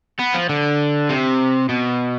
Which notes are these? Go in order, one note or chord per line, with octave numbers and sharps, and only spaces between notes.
B3
F3
D3
C3
B2